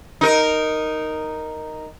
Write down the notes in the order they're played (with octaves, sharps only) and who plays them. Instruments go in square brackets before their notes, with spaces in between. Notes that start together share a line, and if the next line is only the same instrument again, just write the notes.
[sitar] D#4 A#4